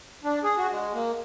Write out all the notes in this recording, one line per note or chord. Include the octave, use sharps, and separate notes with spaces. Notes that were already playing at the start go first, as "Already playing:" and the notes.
D4
G#4
F#4
G#3
A#3